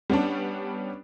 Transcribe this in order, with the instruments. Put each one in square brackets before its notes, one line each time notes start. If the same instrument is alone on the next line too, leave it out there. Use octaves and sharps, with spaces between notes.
[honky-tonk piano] G3 B3 C#4 D4